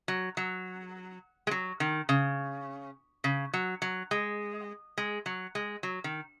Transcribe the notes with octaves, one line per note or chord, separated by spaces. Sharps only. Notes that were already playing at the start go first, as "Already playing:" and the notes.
F#3
F#3
G#3
F#3
D#3
C#3
C#3
F#3
F#3
G#3
G#3
F#3
G#3
F#3
D#3